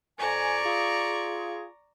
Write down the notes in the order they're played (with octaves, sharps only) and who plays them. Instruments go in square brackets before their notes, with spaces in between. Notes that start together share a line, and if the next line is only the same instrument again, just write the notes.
[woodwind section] F2 G#5 [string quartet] D5 A#5 C#6
[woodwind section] F4 G#4